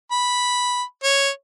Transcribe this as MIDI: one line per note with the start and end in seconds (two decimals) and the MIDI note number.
0.11 0.83 83
1.04 1.29 73